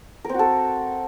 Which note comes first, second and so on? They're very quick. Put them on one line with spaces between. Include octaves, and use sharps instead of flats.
A#4 C4 F#4 A4